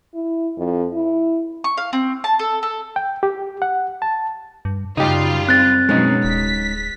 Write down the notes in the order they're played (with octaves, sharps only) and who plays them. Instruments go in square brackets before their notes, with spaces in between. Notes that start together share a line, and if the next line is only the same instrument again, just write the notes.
[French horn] E4
F2
E4
[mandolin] C#6
F5
C4
A5
A4
A4
[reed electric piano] G5
G4
F#5
A5
[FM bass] G2
[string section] F#2 G3 F4 [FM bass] C#3 [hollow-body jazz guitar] D#4 G4
[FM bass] C4 [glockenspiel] F#6 A6
[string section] B2 F#3 [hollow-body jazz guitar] G#3 C#4 D#4
[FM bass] D1 [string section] B6